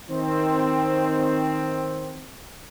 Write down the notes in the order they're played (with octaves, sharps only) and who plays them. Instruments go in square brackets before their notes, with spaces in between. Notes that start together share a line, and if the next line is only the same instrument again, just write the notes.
[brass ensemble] D#3 C4